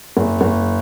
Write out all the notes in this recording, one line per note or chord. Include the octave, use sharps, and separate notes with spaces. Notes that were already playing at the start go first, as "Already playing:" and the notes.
F#1
F#1